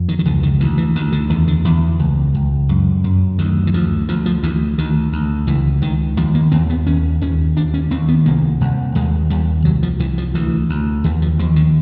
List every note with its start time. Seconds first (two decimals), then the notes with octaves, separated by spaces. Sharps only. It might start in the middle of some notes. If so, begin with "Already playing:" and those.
Already playing: F2
0.09 D#3
0.19 D#3
0.25 C#2 D3
0.43 D#3
0.60 D2 E3
0.78 E3
0.95 D2 D#3
1.12 D3
1.30 E2 D#3
1.47 D3
1.64 E2 D#3
1.99 C#2
2.34 C#2
2.69 F#2
3.04 F#2
3.38 D2 D#3
3.67 E3
3.74 D2 F3
4.09 D2 F3
4.26 F3
4.43 D2 E3
4.78 D2 D#3
5.12 D2
5.47 C#2 E3
5.82 C#2 D#3
6.17 D#2 F3
6.35 A#3
6.52 D#2 C4
6.70 B3
6.87 D#2 C#4
7.21 D#2 C#4
7.56 D#2 D4
7.74 C#4
7.91 D#2 C4
8.08 B3
8.26 C2 A#3
8.61 C2
8.95 D#2 G#3
9.30 D#2 G3
9.65 C2 F#3
9.83 F3
10.00 C2 E3
10.18 F3
10.34 D2 E3
10.69 D2
11.04 D#2 E3
11.22 F3
11.39 D#2 F3
11.56 D3